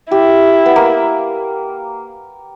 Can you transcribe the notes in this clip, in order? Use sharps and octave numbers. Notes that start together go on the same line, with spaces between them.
E4 G4
B3
A#3